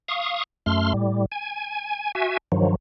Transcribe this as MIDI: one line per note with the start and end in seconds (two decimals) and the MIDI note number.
0.08 0.43 77
0.08 0.43 85
0.08 0.43 87
0.66 0.93 42
0.66 0.93 57
0.66 0.93 84
0.66 0.93 89
0.94 1.25 45
0.94 1.25 55
1.32 2.12 80
2.15 2.37 66
2.15 2.37 76
2.15 2.37 80
2.52 2.75 43
2.52 2.75 51
2.52 2.75 53
2.52 2.75 54